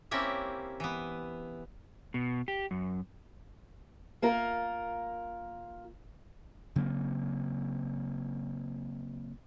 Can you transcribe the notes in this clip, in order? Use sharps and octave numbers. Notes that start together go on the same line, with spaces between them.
A#3 C4 C#4 E4 G4 E5
E3 B3
B2
G4
F#2
A#3 F4 A#4
C#3 F#3 A#3 C4